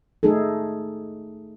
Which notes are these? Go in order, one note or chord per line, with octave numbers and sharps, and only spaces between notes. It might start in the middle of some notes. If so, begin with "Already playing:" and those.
A3 D#4 G#4 A4